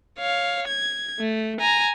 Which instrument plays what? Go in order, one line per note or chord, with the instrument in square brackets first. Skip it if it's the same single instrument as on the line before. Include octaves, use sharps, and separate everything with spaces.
[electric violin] C#5 F5
G#6
A3
G#5 A#5